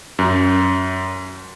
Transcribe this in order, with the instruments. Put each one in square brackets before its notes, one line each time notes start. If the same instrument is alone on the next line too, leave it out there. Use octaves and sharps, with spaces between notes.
[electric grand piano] F#2